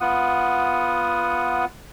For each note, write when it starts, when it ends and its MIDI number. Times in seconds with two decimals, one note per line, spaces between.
0.01 1.65 59
0.01 1.65 65
0.01 1.65 78
0.01 1.65 87